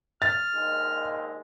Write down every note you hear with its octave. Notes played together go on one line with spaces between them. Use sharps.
F6 A6
A#1 D#2 G#3